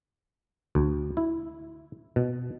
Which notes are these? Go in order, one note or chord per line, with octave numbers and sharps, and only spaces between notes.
D2
E4
B2